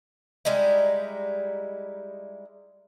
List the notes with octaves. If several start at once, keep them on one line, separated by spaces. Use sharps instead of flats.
G3 G#3 D#4 E4